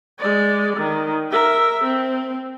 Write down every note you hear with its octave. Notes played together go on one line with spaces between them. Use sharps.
G#3 D5
D#3
A#4 E5
C4